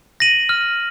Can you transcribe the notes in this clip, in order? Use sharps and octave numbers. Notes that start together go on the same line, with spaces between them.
A#6 D#7 F#7
F6